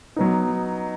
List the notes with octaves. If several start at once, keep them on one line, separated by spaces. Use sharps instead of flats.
F#3 B3 D#4